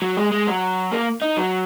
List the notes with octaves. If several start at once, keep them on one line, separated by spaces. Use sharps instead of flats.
F#3
G#3
G#3
F#3
A#3
D#4
F#3